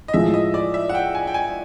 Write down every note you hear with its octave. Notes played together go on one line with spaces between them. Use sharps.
D#5
A2 F3 G#3 E5
D#5
D5
E5
F#5
G5
G#5
G5
G#5